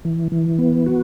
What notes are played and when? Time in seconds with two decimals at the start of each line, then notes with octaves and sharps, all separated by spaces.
0.05 E3
0.32 E3
0.59 B3
0.86 F#4